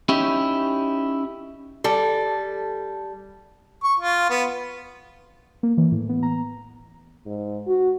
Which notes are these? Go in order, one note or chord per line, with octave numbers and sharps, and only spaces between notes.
C#4 D#4 E4 G4
G3 A4
C#6
F4
B3
A#3
E3
A2
B3
A#5
G#2
F#4